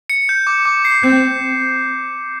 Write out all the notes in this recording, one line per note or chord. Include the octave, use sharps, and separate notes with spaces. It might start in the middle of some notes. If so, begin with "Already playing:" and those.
C#7
G6
D6
D6
C7
C4 G6